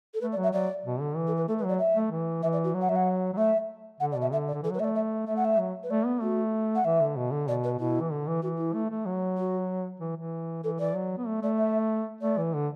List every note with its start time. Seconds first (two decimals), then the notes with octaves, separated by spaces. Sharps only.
0.14 A4
0.21 A3 B4
0.32 D5
0.37 F#3
0.43 E5
0.53 F#3 D5
0.85 B2
1.01 D3
1.16 E3
1.27 A4
1.37 B4
1.48 A3 A4
1.58 B4
1.64 F#3
1.69 D5
1.79 E5
1.95 A3
2.11 E3
2.42 E3 E5
2.53 D5
2.64 F#4
2.74 F#3
2.81 F#5
2.89 F#3 E5
2.96 F#5
3.33 F#3
3.37 A3 E5
4.00 D3 F#5
4.12 D5
4.16 B2
4.22 E5
4.32 D3 E5
4.47 D5
4.54 D3
4.62 E3 A4
4.71 F#3 B4
4.80 A3 D5 E5
4.95 E5
5.27 A3 E5
5.36 F#5
5.45 E5
5.58 F#3
5.83 B4
5.90 A3 D5
6.06 B3
6.21 A3 F#4
6.75 F#5
6.85 E3 E5
7.00 D3
7.17 B2
7.32 D3
7.48 B2 D5
7.64 B4
7.79 B2 E4
8.00 E3
8.11 D3
8.27 E3
8.42 E3 F#4
8.58 E4
8.74 A3
8.90 A3
9.06 F#3
9.38 F#4
10.00 E3
10.16 E3
10.63 E3 A4
10.80 E3 D5
10.95 F#3
11.18 B3
11.27 A3
11.42 A3 D5
11.58 E5
12.21 A3 D5
12.37 E3
12.53 D3